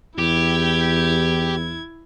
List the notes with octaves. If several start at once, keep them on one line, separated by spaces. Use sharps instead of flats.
E2 E4 G4 G#6